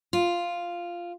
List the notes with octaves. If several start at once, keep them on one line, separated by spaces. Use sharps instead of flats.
F4